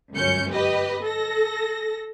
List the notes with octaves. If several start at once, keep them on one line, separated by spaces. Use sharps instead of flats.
G1 C#2 F#2 C#4 G6 C#7
G4 B4 D#5
A4 A#6